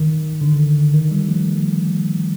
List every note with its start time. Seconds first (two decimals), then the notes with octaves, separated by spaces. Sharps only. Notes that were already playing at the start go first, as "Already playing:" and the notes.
Already playing: D#3
0.41 D3
0.94 D#3
1.11 D#3 G3
1.28 F3 A3